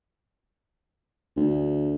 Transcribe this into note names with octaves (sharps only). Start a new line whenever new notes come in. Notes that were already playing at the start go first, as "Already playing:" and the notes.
D2